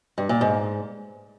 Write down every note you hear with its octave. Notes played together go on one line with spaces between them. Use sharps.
G2
A#2
G#2